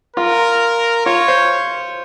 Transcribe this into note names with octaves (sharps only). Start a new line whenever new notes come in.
F4 A#4
F4 C#5
C5